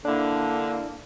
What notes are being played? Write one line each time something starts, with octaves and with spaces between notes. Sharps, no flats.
D3 A#3 D4 E4